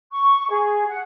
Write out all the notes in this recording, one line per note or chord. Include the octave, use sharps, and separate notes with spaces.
C#6
G#4
F#5